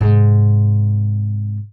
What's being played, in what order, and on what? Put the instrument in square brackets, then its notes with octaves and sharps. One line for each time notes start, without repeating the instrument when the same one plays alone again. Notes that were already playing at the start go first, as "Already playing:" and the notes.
[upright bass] G#2 C3